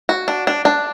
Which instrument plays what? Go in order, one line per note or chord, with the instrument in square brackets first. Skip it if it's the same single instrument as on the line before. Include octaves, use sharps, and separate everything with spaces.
[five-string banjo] F#4
D4
D4
D4